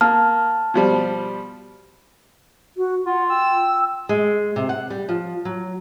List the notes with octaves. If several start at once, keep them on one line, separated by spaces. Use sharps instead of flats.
A#3 A5 F6
B2 F3 G3
F#4
F4 F#5
G5 E6
G#3
C3
F#5
G3
F3
F#3